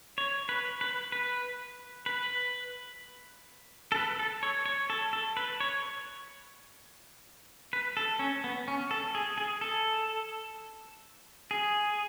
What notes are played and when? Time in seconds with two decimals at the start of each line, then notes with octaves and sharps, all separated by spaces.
0.18 C#5
0.49 B4
0.81 B4
1.12 B4
2.06 B4
3.92 A4
3.96 B4
4.19 A4
4.43 C#5
4.66 C#5
4.90 A4
5.13 A4
5.37 B4
5.60 C#5
7.73 B4
7.97 A4
8.19 C#4
8.44 B3
8.68 C#4
8.91 A4
9.15 G#4
9.38 G#4
9.61 A4
11.51 G#4